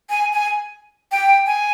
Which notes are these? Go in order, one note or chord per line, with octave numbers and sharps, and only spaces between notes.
G#5
G#5
G5
G#5